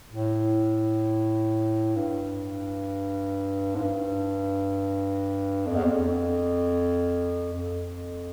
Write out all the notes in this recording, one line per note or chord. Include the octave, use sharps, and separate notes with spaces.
A2
G2
G#2
G2
F2
E2
F2
F2